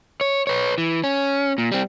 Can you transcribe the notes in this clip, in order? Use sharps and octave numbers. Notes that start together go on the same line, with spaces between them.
C#5
B4 C#5
E3
C#4
A#2
G3 C4